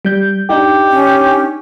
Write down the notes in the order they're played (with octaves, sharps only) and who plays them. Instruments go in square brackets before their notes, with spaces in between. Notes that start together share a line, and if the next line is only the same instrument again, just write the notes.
[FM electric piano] G3 G6
[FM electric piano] D4 D#4 [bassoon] G4
[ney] C#4